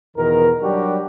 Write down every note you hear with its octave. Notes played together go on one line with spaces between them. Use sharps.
E2 B2 D#3 A#4
F#3 G3 D4 F#4 G4